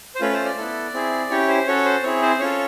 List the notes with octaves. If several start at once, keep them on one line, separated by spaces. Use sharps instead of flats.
C5
A3 C#4 F4 B4
C5
D5
B3 E4 A4
C4 E4 G#4
C#4 E4 G4 C#5
C5
C#4 F#4 A4 C#5
C5
C4 E4 G#4 C#5
C5
C#4 F4 A4 C#5